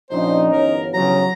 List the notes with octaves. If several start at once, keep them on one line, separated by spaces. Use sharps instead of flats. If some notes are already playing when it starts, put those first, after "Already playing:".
A#1 C#4 D#4 C5
G1 E3 A#4 C#5
C#3 F3 F#3 A#5